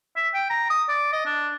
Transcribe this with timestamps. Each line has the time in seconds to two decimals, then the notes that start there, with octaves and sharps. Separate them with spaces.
0.16 E5
0.34 G5
0.50 A#5
0.70 D#6
0.88 D5
1.13 D#5
1.25 D4